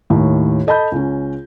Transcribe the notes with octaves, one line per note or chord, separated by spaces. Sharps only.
D#2 A2 D#3
A4 D#5 A5 B5 G6
C#2 C#4